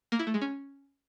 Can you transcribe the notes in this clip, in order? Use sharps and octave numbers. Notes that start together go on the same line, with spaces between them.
A#3
E4
A3
G#3
C#4